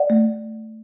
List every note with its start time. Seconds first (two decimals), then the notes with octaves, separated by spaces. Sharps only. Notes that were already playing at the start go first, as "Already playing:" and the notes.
Already playing: D5 F#5
0.10 A3